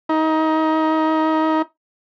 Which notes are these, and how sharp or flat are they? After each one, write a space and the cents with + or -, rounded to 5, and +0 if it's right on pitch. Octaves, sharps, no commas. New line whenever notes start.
D#4 +25